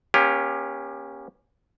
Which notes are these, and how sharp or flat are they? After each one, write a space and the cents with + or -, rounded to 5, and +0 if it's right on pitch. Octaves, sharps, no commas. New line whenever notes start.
A#3 +45 C#4 +0 G4 +25